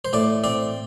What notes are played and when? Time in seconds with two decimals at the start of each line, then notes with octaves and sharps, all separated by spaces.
0.05 C5
0.13 A2 D5
0.44 C4 D5